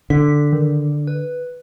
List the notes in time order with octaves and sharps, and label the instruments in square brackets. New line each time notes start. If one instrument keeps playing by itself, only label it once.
[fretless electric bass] D3 [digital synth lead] B6
[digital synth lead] D#3
B4